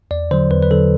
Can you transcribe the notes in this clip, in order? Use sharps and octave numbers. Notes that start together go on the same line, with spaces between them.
E2 D5
D3 F#3 C5
E2 B4
B4
D3 F#3 A4